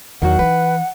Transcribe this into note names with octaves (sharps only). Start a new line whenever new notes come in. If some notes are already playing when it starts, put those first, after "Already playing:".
E2 D#3 F#3 F#4 F#5
E3 D#4 B4